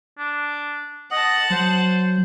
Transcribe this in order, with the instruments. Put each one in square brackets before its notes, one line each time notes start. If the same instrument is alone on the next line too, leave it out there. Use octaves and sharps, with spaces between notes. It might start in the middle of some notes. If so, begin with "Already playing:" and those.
[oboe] D4
[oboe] D#5 [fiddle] F#5 A5
[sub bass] F#3 [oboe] C5